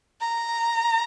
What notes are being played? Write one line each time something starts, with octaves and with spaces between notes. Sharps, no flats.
A#5